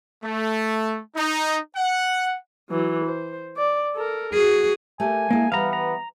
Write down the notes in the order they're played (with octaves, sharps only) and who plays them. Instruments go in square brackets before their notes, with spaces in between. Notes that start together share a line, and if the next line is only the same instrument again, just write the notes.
[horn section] A3
D#4
F#5
[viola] E3 F#3
C5
D5
A4 A#4
[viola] F#4 [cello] G#4
[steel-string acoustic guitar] A3 G4 A#4 [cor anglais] G#5
[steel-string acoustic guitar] G#3 E4 G#4 [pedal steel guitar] A#3
[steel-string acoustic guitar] E3 G3 G5 [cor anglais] B3 [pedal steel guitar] F5 A#5
[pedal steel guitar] A#5